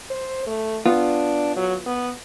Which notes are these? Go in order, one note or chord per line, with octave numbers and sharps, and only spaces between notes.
C5
A3
B3 D4 F4
F#3
B3